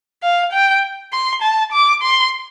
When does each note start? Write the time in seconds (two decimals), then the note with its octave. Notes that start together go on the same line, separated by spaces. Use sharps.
0.23 F5
0.53 G5
1.12 C6
1.42 A5
1.72 D6
2.02 C6